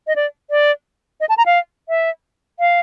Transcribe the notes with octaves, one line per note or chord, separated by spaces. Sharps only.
D#5
D5
D5
D#5
A5
A#5
F5
E5
F5